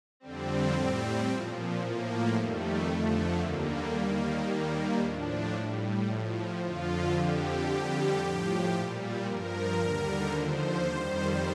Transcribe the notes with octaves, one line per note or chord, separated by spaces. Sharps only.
F2 D3 G3 C4
A2 G3
A#2 F3
A2 F3 A#3
F2 D#3 G3 A3
F2 D3 F3
D#2 D3 G3 A#3
D#2 D#3 G3
D#2 D#3 G3 A#3
A2 F3 D4
A2 G3
A2 F3
F2 D3 F3 F4
F2 D3 F3 G4
F2 D3 G3 G4
A2 F3
A#2 G3
G2 F3 A#4
D#2 D3 G3
D#2 D3 F3 C5
F2 D#3 G3